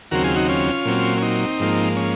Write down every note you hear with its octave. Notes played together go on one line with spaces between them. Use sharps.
D#2 C#3 F#3 C4 F#4 A#4
F4 G#4
D#4 F#4
C#4 F4
A#2 F#3 C4
C#4
C4 D#4
G#2 F3 A#3
C#4